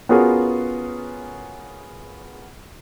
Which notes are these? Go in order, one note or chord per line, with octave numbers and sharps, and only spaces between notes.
B3 C#4 F4 F#4 G#4 A#4